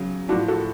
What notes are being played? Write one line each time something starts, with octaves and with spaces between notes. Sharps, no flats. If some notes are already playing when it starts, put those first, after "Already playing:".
Already playing: C#3 F#3
A2 F3 D4 F#4
F#4 A4